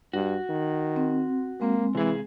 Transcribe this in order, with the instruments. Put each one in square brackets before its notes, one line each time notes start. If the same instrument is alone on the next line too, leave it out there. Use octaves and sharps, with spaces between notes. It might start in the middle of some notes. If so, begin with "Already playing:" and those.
[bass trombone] G2 [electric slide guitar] F#4
[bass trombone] D#3
[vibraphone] C4
[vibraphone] G#3 C4 [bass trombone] A#3
[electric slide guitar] C3 G#4 [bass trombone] E3